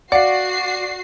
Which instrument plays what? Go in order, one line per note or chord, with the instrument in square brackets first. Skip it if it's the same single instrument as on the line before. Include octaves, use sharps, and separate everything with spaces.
[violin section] F#4 C7 [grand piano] D5 [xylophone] F5 F#5